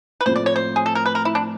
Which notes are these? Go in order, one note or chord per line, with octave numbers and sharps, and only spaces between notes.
B4
A2 F3 A3 C4 C5
D5
C#5
C5
G#4
A4
A#4
B4
A#4
E4
D4